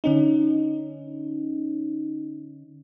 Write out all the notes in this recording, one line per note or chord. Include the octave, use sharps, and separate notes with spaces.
D3 C#4 D#4